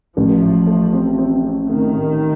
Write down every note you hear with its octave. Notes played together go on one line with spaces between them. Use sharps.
A1 F3
A2
A3
C4
C4
C4
D#3 A3
A2